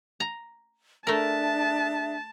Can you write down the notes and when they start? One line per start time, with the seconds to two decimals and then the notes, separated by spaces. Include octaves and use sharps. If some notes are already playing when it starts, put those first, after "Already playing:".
0.20 A#5
1.07 A3 D4 G#4 A#4 E5 A5